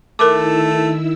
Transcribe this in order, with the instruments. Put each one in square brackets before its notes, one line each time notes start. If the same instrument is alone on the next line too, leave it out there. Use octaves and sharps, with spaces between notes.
[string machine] D#3 E4 E6 [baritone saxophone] A3 [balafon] A#4 D6